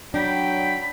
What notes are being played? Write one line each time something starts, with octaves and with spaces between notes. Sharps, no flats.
F#3 D4 G5 B5